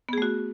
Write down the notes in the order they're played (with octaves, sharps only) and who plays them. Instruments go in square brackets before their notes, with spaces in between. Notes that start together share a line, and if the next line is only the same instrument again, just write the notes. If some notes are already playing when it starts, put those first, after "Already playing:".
[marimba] B3
G#4
A3
F#4